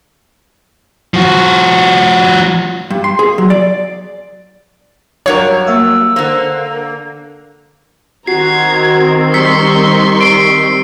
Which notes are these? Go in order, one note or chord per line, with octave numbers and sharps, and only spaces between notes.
F3 F#4
G2
C6
G#4
F#3
D5
G2 F#3 A#4 C#5
A#3 E5 F5 E6
D3 A#3 C5
D#3 C4 F#4 A#5 G#6 C7
G3 C6 C#6 E6 B6 C#7
C7 D7